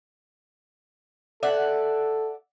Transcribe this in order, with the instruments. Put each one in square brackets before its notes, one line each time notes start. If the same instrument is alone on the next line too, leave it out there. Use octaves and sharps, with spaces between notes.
[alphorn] A4 [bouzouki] D5 E5 F#5